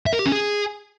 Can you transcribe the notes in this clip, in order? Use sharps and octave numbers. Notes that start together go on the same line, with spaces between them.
E5
A#4
G4
C#4
G#4